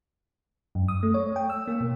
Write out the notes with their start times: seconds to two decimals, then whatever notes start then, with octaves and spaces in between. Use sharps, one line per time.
0.75 F#2
0.88 D#6
1.03 A3
1.14 C#5
1.36 G5
1.50 E6
1.67 A#3
1.80 B2